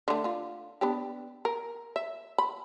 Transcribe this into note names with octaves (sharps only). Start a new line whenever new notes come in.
D3 A3
D3 F4
B3 D4 G4
A#4
E5
B5